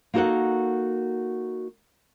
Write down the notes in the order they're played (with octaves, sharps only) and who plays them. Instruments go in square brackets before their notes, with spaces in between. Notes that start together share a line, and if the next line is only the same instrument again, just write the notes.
[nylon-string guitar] A#3 D#4 F#4 A4 A#4 F#5